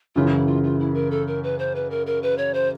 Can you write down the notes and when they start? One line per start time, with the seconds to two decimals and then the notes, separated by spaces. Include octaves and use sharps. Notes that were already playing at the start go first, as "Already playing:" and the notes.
0.15 F#2 C#3 E3 F4
0.31 E4
0.47 F4
0.64 F4
0.80 E4
0.94 A#4
1.11 A4
1.27 A#4
1.43 B4
1.59 C5
1.75 B4
1.90 A#4
2.07 A#4
2.23 B4
2.38 C#5
2.54 C5